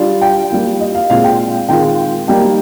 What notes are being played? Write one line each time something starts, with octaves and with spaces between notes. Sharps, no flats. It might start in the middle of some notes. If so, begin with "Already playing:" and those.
Already playing: G3 D4 F4
G5
G3 A#3 F4
D#5
F5
A#2 G#3 C4 F4 F5
G5
D#3 G#3 C4 F4 G5
G3 A#3 D#4 G5